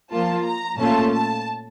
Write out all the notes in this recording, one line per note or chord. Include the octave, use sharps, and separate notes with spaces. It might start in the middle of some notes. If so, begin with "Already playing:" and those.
F3 A#3 F4 A5
A#5
A#2 A3 C#4 F4 A5
A5